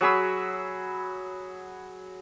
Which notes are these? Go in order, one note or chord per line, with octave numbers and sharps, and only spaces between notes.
F#3 G#4 B5 E6